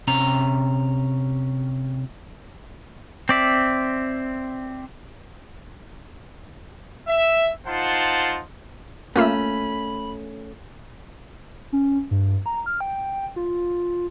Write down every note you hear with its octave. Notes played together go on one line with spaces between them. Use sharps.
C3 C#4 A#5
C4 D5 E5
E5
D#4 F4 C5 F#5 A5 C6
A3 A#3 C#4 F4 E5 B5
C#4
G2
A#5
F6
G5
F4